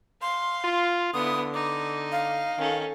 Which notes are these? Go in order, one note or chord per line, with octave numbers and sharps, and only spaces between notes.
F5 C6
F4
D3 B3 E4 D#6
D#4 D6
F5
D#3 C#4 A4